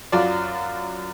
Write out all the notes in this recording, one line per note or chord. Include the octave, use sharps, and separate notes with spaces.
F#2 F4 F#4 D5